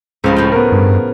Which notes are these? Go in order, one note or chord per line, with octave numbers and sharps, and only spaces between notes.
C#2 A2 C#3 F3
A2 G5
B3 A#4
G2